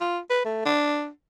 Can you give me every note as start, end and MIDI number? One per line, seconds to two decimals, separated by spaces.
0.01 0.19 65
0.30 0.40 71
0.45 0.61 57
0.65 1.08 62